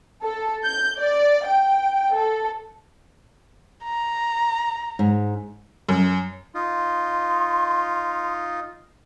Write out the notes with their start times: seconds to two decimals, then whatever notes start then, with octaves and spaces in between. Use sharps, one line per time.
0.22 A4
0.64 G6
0.99 D5
1.46 G5
2.14 A4
3.84 A#5
4.99 G#2
5.89 F#2
6.55 D#4 F4 C6